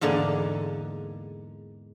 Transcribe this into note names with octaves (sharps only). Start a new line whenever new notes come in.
E2 G#2 D3 A#3 D4 G#5